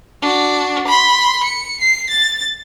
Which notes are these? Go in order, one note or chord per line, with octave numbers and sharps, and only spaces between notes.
D4 F#4
B5 C6
C#7
C7
A6